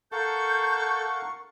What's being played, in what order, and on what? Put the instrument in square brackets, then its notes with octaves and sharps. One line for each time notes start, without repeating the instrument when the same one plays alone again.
[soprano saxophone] A4 [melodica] A#4 F5 F#5 [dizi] C#6 [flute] G6